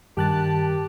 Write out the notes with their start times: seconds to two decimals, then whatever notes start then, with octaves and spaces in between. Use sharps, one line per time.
0.17 G2 D#3 G4 A5 F#6 A6